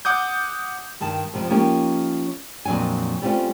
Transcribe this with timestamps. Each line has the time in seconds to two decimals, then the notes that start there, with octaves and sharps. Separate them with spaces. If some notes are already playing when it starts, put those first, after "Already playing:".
0.05 F#5 D6 D#6 G6
1.01 G2 D#3 A5
1.34 F2 C3 F3
1.50 F3 A#3 C#4 D#4 G4
2.65 F2 A#2 F#3 D4 G#5
3.22 G3 A3 C4 C#4 F4